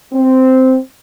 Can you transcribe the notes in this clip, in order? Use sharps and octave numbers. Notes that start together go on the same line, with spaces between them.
C4